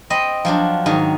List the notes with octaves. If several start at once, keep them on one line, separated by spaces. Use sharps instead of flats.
C4 D#5 B5
F3 F#3 D4
G#2 D#3 F#3